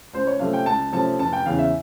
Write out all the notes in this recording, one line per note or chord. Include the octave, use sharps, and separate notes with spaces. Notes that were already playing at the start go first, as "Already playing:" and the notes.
C#2 C5
C#5
C3 F3 A3 C#4 F5
G5
C#2 A5
C3 F3 A3 C#4 A5
F1 A5
G5
E2 C#3 F5
E5